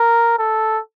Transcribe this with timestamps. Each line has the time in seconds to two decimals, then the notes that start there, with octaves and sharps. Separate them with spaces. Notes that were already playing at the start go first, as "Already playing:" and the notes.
Already playing: A#4
0.39 A4